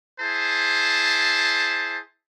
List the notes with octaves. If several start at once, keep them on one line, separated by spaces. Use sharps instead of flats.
E4 G#4 C5 A5